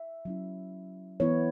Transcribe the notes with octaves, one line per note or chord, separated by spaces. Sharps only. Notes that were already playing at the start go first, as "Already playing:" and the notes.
Already playing: E5
F#3 C#4 E4
E3 B3 E4 C#5